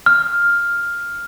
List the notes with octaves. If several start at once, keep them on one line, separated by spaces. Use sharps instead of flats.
F6